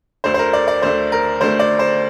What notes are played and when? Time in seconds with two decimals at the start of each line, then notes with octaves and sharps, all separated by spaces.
0.24 D2 D3 A3 C5
0.34 C5
0.39 A#4
0.53 D5
0.68 D5
0.82 D2 D3 A3 C5
1.12 A#4
1.41 D2 D3 A3 C5
1.59 D5
1.79 C5